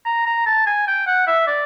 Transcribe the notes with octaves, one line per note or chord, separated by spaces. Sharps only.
A#5
A#5
A5
G#5
G5
F#5
E5
D5